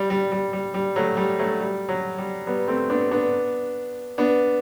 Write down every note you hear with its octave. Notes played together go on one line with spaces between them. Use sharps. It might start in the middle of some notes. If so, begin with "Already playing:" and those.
Already playing: G3
G3
G3
G3
G3
F#3 A3
G3
F#3 A3
G3
F#3
G3
G3 B3
A3 C4
B3 D4
B3 D4
B3 D4